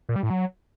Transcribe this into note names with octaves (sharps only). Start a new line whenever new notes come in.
A#2
G3
A2
F#3